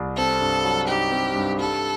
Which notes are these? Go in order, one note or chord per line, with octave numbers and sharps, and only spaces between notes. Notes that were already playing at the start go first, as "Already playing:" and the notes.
Already playing: C2
C4 A4
G2
F#3
D#4 G4
C4
G2
G3 A4